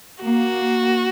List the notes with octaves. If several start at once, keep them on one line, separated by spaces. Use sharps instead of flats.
A#3 F#4